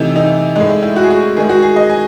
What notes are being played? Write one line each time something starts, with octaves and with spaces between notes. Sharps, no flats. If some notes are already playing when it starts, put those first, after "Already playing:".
Already playing: C3 E3 A3 D#4
D#4
A2 G#3 D#4
E4
E4
F#4
G#4
F#4
D#3 G#3 G#4
F#4
G#4
D#5
G#5